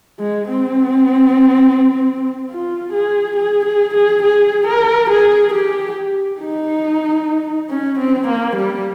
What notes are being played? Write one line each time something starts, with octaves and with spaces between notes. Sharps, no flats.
G#3
C4
F4
G#4
G#4
G#4
G#4
G#4
A#4
G#4
G4
D#4
C#4
C4
A#3
G3